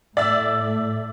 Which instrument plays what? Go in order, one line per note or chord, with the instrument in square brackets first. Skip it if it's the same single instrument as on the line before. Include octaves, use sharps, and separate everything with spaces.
[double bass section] A2 A3 [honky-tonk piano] D5 E5 E6